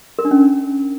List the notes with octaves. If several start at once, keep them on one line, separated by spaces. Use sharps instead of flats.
A#4
D4
C#4